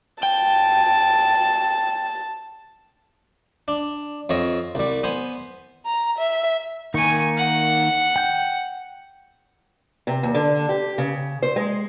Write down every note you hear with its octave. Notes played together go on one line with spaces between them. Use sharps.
G5 A5
D4
F2 C4 C#5 D#5
C2 G3
B3 C5 G#5
A#5
E5
D#3 A#3 D#4 G#5 C#6
F#5
G5 G6
C3
D#2
D3
G4
C#3
C5
G#3